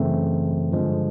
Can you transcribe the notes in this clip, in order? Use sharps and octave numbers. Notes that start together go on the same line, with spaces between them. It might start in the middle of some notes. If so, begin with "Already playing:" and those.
Already playing: F#2 C#3 E3 A3 C4
G2 D3 F3 G#3